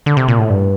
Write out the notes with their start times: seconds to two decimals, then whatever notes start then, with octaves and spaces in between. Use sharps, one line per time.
0.06 D3
0.17 C3
0.28 A#2
0.39 A2
0.50 G2